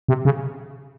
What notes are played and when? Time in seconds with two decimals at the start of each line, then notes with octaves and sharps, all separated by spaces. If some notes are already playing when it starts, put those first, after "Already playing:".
0.08 C3
0.25 C#3